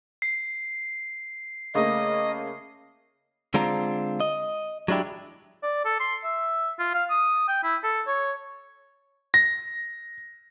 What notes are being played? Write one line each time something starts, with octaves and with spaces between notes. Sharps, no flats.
C7
C#3 A3 A#3 D#5
D3 G#3 C4 D4 F4 A#5
D#5
F#3 G#3 D4 E4 G4
D5
A4
C6
E5
F4
F5
D#6
G5
E4
A4
C#5
A#6